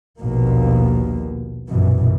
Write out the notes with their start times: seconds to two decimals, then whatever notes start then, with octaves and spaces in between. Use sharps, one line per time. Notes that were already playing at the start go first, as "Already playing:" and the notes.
0.22 A#1 D#2 B2 A#3
1.69 A#1 F#2 B2 E3